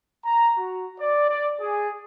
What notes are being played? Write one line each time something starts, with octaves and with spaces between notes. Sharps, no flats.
A#5
F#4
D5
D5
G#4